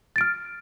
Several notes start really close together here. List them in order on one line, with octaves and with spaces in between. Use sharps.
A6 D7 F6